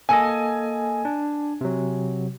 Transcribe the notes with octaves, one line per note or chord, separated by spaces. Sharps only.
A#3 A4 D#5 G#5
D4
C3 F#3